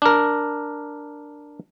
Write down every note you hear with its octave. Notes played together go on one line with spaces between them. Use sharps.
D4 A#4